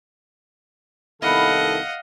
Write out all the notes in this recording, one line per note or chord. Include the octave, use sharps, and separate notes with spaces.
C2 D#3 B3 E4 A4 D#5 F5 F#5